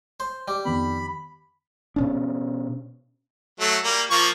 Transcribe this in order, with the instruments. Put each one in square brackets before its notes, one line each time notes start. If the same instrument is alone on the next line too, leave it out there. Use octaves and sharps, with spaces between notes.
[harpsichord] C5
[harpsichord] G3 [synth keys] D6
[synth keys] F2 D#3 B3 [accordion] B5
[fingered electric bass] B2 C#4 D4
[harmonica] F#3 A3
G3 A#3
F3 A#3 C#6